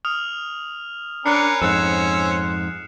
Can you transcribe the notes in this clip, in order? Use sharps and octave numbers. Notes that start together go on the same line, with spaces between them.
D#6 F6 F7
C#4 D4 A#4 B4 F#6 C7 C#7
F2 G#2 C#4 C5 E6 F#6 C7 E7